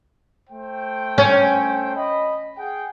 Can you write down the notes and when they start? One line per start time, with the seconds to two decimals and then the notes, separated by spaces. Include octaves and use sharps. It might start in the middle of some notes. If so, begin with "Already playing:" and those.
0.50 A3 C5 G5
1.18 C#4
1.95 D#5 B5
2.57 G#4 F#5 G5